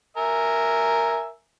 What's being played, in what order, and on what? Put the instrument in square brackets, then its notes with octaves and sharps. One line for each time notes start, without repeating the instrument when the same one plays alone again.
[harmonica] A#4 E5 G#5